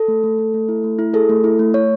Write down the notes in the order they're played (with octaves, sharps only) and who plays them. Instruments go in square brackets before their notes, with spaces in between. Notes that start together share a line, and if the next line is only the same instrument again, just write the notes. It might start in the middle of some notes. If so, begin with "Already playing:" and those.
Already playing: [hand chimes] A4
A3
A3
A3
A3
E4
A3
E4
G#4 A4
A3
E4
A3
A3 C#5